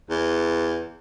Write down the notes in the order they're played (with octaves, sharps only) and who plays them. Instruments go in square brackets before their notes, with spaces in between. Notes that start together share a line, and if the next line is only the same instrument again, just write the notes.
[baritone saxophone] E2